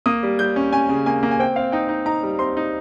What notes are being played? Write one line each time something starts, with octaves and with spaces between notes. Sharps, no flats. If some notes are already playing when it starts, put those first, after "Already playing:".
A#3 D#6
G3
G3 G6
C#4
C#4 G#5
C#3
A#3 G#5
A#3
G#5
C4 G5
C4 F5
D#4 G5
D#4
D#4 A#5
G3
C4 C6
D#4